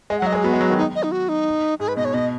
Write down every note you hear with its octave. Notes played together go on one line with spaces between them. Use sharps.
G#3 D#5
F#5
F#3 D#5
G#3
G#4
B3 F#4
G#3
F#3
D#3
D#4
D#5
D#4
F#4
D#4
G#2 G#4
B4
B2 D#5
C#5
B2 D#5